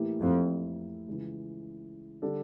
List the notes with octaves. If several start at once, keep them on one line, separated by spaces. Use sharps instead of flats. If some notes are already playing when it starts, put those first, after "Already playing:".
Already playing: A2 E3 A#3 E4 G4
F2
C#2 C#3 E3
D3 G3 D4 A4